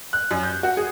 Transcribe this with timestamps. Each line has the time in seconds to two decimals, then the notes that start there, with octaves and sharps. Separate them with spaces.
0.13 F#6
0.31 F#2
0.43 G6
0.63 F#4
0.77 G#4